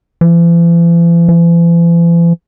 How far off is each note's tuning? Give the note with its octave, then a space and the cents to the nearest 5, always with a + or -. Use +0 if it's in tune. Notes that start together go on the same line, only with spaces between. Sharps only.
E3 +45
E3 +45